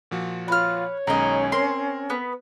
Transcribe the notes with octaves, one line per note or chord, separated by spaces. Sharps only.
A#2 F3 F#4
F4 B4 C#5 F6
B1 D#3 G#3 C#4 D#5 A#5
C4 A#4 C6
B3 B4